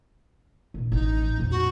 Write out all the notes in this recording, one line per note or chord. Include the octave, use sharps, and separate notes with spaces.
A#2 D#3
A1 D#4
A#1 F2
F#4